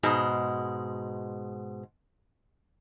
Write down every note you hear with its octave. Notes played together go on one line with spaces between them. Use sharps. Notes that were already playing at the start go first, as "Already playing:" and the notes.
G#2 B2 G#3